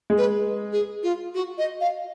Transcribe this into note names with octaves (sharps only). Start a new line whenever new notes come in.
G#3
B4
G#4
F4
F#4
D#5
F5